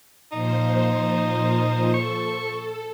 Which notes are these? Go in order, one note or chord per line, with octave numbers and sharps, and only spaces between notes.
A#2 F3 D#4 C5
A4 C#6